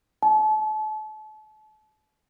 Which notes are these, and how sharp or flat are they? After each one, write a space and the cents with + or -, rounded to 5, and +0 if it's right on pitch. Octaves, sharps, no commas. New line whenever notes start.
A5 -35